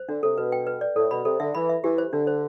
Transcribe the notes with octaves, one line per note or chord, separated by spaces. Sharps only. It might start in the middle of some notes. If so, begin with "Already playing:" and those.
Already playing: C5
D3 D4
C3 A4
B2 B4
G5
B4
D5
A2 A4
B2 B5
C3 A4
D3 E5
E3 B5
E5
E3 G4
C5
D3 D4
C5